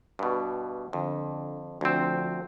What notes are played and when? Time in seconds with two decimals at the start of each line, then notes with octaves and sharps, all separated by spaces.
0.19 G2 B2
0.93 F2 D3
1.81 D2 D3 F3 C4